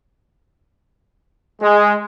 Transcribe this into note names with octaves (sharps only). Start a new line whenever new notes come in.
G#3